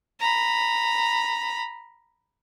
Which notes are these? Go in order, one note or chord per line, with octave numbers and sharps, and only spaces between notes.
A#5 B5